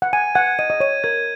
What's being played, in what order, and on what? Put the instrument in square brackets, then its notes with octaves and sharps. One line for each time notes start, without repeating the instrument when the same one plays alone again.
[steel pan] F#5
[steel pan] G#5 [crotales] D#7
[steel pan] F#5 [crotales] G#6
[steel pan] D#5 [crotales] D#7
[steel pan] D#5
[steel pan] C#5 [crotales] D#7
[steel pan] A#4 [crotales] G#6